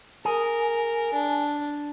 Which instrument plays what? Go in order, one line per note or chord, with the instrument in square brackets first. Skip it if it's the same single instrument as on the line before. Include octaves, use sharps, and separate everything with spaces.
[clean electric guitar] G#4 [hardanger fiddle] A#4
[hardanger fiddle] D4